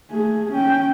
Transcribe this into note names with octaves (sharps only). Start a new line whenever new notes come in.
A3 G#4
C#4 G5